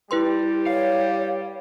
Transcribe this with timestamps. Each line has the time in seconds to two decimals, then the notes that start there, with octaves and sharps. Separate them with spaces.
0.11 G3 E4 G4 B4 C6
0.67 C#5 F5